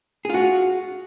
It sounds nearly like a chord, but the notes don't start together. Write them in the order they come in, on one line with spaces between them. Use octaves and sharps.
G#4 F4 F#4